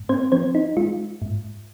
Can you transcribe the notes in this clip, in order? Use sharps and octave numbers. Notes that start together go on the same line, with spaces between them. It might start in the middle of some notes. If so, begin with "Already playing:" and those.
Already playing: G#2
C4 C5
F3 C4 C5
D#4
G#3 F4
G#2